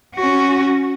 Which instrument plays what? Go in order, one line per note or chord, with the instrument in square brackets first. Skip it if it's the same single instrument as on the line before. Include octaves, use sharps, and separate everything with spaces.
[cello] C#4 F#4